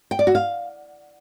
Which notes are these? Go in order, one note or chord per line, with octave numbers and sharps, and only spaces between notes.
G5
D5
F#4
F5